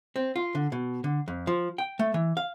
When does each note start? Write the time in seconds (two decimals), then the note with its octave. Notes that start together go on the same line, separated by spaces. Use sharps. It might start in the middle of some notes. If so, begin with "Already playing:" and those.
0.16 C4
0.36 F4
0.55 D3
0.72 B2
1.04 D3
1.28 F2
1.47 F3
1.78 G5
1.99 A3
2.14 E3
2.37 F5